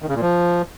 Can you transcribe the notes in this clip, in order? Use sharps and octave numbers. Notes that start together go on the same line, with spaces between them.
D#3
C#3
A#2
F3